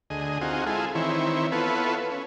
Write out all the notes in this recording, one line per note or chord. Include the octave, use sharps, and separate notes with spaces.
D2 G#4 D#5
C4 D#4 F4 F#4 G#4
G#3 E4 F4 G#4 A4
D#3 E3 C4 E4 C#5
B3 E4 F4 A4 B4 C#5
C#4